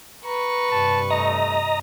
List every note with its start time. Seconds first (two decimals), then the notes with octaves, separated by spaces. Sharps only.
0.24 B4 A#5 C#6
0.71 G2 C3 A5
1.10 A3 D#5 A#5